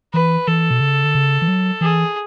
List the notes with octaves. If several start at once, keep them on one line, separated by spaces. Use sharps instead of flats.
E3 B4
E3 A4
B2
C#3
D3
C#3
E3
F#3
E3 G#4